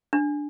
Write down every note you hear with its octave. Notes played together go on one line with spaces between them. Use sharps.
D4